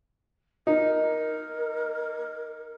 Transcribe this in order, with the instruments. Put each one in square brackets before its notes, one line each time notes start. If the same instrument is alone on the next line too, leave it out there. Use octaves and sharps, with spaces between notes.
[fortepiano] D#4 [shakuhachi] A#4